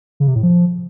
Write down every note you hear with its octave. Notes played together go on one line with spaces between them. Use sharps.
C#3
C3
A2
F3